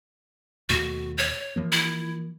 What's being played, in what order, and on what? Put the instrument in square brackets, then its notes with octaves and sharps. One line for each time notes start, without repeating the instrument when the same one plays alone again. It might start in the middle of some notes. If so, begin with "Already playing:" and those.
[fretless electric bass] D#2 B2 A3 [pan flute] F#4
[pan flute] C#5
[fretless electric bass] E3 F3 A#3
[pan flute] E4